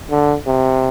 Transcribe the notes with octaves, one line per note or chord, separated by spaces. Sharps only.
D3
C3